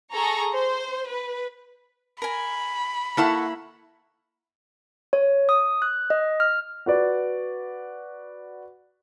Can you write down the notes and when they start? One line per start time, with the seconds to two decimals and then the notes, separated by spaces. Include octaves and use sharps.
0.13 G#4 A4 A#5 C#6
0.56 C5
1.10 B4
2.22 A#4 G#5 B5
3.17 A#3 E4 A4 E5 F#5 C#6
5.13 C#5
5.49 D#6
5.82 F#6
6.10 D#5
6.40 F6
6.86 F#4 B4 D5